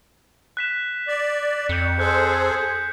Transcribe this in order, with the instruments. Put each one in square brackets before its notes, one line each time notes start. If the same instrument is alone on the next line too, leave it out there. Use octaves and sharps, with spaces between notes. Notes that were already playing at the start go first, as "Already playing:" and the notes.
[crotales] F#6 B6 E7
[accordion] D5
[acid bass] F2 [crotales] G6 C#7
[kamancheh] G#4 [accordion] A4 C5 [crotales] F#6 G6